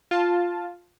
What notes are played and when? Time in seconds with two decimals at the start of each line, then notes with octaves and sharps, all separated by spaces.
0.11 F4 A5